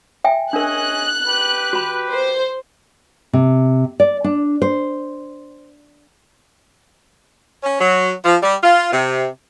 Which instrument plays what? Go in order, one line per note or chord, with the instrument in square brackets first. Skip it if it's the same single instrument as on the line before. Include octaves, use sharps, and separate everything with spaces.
[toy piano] E5 G5 G#5
[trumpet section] C#4 G#4 D#5 [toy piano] D4 A#4 [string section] F#6
[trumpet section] G4 B4
[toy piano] F#4 B5
[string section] C5
[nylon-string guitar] C3
D5
D4
C5
[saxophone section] C#4
F#3
F3
G3
F4
C3